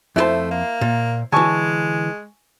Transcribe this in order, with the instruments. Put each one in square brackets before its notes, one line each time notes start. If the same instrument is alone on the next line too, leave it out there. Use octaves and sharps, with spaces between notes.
[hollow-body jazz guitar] F2 F#4 A5 [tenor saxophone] A3 [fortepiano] E4 C5
[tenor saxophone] A#3
[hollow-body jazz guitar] A#2
[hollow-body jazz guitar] D3 E3 [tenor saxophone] G#3 [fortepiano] G#5 A5 C#6